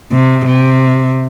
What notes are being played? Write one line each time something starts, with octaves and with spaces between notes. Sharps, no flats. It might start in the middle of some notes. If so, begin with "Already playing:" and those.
C3
C3